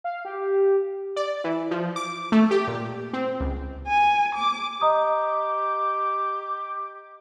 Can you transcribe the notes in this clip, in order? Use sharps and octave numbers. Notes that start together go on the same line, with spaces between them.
F5
G4
D5
E3
F3
D6
A3
G4
A#2
C4
C#2
G#5
D6
G4 D#5 A#5 D#6